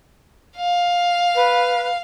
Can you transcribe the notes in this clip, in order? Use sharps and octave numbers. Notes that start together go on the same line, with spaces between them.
F5
B4